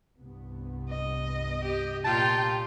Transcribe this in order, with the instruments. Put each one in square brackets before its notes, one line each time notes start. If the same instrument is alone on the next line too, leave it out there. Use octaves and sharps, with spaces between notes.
[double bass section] C2 G2 B3
[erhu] D#5
[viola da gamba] G4
[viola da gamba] A#2 F4 G4 [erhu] G5 [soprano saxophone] A5